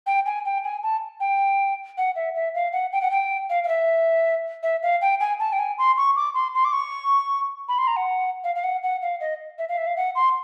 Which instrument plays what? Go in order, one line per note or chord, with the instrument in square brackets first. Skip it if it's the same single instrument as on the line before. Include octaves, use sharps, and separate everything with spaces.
[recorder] G5
G#5
G5
G#5
A5
G5
F#5
E5
E5
F5
F#5
G5
F#5
G5
F5
F5
E5
E5
F5
G5
G#5
A5
G5
G#5
C6
C#6
D6
C6
C6
D6
C#6
B5
C6
A#5
F#5
F5
F5
F#5
F#5
F5
D#5
E5
F5
E5
F5
F#5
C6